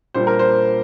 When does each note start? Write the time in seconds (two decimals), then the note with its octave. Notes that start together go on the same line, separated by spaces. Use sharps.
0.14 A#2 G3 D4 C5
0.27 A#4
0.39 C5